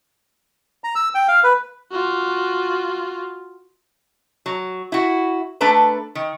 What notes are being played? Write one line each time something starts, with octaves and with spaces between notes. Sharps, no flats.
A#5
E6
G5
F5
B4
F4 F#4
F#3
E4 F#4
A3 D4 A4 B4 A#5
D#3